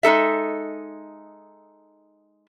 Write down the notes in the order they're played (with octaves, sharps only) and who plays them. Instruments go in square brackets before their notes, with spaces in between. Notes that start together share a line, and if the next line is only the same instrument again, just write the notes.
[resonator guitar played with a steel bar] G#3 D#4 A4 E5